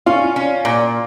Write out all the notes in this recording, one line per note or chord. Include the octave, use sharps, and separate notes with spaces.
C#4 F4
C#4
A#2